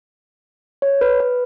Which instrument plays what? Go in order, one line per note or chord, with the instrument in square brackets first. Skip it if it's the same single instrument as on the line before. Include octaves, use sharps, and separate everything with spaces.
[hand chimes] C#5
B4
B4